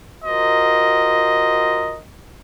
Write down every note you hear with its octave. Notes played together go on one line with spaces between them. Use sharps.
F4 F#4 A#4 C5 D#5